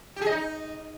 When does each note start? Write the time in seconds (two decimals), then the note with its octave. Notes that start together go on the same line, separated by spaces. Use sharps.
0.16 G4
0.22 G#4
0.27 D#5
0.32 D#4